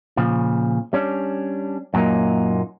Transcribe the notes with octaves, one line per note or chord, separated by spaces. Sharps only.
A#2 C#3 F3
G3 C#4 D4
F#2 A#2 F#3 A#3 D#4